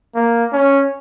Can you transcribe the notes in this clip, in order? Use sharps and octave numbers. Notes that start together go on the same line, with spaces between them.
A#3
C#4